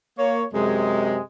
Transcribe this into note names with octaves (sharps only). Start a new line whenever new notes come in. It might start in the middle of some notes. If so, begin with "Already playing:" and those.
A#3 C#5
F#2 C3 G#3